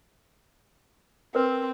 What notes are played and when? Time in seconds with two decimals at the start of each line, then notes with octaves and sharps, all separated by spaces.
1.35 C4 A#4 B4